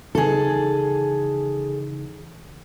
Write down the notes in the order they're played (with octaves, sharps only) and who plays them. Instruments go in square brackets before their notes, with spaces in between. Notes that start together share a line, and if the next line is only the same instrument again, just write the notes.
[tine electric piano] C#3 E3 D#4 [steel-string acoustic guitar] G#4 A4